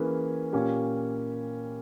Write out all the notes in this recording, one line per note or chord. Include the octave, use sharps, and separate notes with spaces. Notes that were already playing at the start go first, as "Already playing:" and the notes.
Already playing: E3 A#3 C#4 G#4 B4
A#2 A#3 C#4 G4